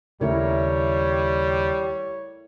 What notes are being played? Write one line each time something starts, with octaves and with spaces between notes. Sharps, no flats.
D#2 C#3 G3 A3 E4 A#4 C#5